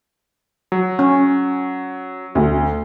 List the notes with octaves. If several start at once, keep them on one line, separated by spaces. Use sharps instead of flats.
F#3
C#4
D2